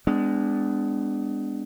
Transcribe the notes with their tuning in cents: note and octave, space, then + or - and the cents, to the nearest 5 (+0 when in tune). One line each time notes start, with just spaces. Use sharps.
G#3 -20 B3 +30 D4 +0